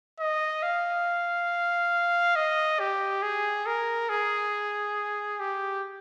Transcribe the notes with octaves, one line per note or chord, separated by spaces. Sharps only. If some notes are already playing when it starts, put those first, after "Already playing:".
D#5
F5
D#5
G4
G#4
A#4
G#4
G4